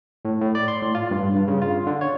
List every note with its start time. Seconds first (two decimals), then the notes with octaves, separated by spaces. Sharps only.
0.25 A2
0.41 A2
0.55 D5
0.68 C6
0.82 A2
0.95 F4
1.11 G2
1.35 G2
1.48 C#3
1.62 F4
1.87 D3
2.01 C#5